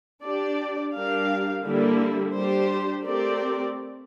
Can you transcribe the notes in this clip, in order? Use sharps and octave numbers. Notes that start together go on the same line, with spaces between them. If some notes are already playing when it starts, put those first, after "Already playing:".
D4 G4 D5
G3 D4 G4 A#4 F5
D3 G3 A#3 E4
G3 D4 G4 C5
A3 C4 G4 A#4 D5